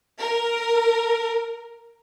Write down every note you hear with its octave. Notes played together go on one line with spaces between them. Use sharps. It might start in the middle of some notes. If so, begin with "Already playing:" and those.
A#4